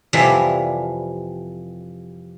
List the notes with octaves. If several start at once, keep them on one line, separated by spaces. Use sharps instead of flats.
F2 C3 E3 F3 G3